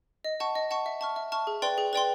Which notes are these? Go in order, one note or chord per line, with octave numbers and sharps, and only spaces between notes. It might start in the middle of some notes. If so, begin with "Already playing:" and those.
D#5
F#5 A5 C#6
D#5
F#5 A5 C#6
E5
A5 C#6 F6
E5
A5 C#6 F6
G#4
B4 D5 G5 C6
G#4
B4 D5 G5 C6